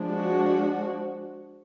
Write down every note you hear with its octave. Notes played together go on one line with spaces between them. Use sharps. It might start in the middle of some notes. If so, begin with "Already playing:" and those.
Already playing: F3 G#3 D4
F#4